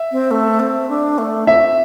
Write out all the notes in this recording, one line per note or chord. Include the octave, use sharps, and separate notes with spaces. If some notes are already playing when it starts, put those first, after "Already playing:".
Already playing: E5
C4
A3
C4
D4
A3
C4 E5